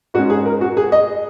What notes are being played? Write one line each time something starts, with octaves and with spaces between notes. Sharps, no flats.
G#2 G#3 C#4 F#4
G#4
A#4
F#4
G#4
D#5